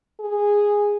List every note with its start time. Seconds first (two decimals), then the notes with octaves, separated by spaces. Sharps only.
0.20 G#4